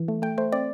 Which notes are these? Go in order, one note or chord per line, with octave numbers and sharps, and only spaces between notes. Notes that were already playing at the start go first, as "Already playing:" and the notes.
Already playing: E3
A3
A3 G5
A3 C5
C4 D5